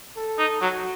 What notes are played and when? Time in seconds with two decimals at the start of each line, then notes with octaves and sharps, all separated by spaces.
0.17 A4
0.39 D#4
0.62 F#3 F#4